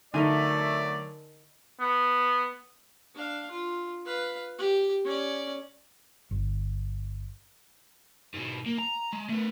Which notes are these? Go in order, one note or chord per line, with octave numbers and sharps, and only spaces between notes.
D3 F#3 A3 D#4 A#4 D5 G#5
B3
D4 F5
F4
B4 F5
G4
C#4 D5
G1
G#2 B2
A#3
A#5
G#3
A3 B3